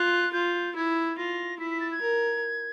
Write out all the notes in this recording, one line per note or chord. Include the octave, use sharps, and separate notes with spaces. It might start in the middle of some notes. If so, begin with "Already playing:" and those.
Already playing: F4 F#6
F4 G6
E4 G#6
F4 A#6
E4 B6
B6
A6
G#6
A#4